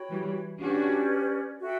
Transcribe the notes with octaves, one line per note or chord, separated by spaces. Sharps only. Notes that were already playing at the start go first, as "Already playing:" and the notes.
Already playing: F#4 C#5 G5 B5
E3 G3
C#4 D4 F#4 G4 B4 D5
F#4 A4 E5 G5